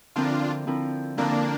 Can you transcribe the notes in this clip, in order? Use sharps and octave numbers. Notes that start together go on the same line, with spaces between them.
D3 F3 C4 D4 E4 F4 A#4
D3 F3 C4 E4 A#4
D3 F3 A#3 C4 D4 E4 A#4